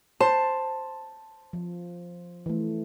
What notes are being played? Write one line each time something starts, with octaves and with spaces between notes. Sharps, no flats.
C5 A5
F3
E3 A3